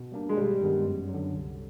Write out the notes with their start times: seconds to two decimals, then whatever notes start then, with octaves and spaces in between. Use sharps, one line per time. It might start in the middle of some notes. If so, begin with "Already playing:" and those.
Already playing: B2
0.12 G3 A#3 D4
0.29 G#3
0.37 G#1 G3
0.60 G2 D#3 G#3 B3
0.85 F#2
1.09 F#3
1.14 D3
1.34 C2